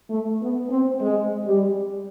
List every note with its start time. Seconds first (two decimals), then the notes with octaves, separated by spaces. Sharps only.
0.10 A3
0.41 B3
0.70 C4
1.00 G#3
1.46 G3